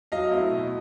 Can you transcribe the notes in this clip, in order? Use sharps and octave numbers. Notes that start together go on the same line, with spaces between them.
F#3 D#5 F5
A3 C4 E4
B2